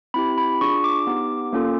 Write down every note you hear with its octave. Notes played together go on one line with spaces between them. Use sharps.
C4 E4 G4 B5
B5
D4 F4 G#4 C#6
D6
B3 D#4 G4
A#3 C#4 F4 A4